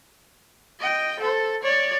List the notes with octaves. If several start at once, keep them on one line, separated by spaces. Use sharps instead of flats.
D#5 G5
A4 C5
C#5 D5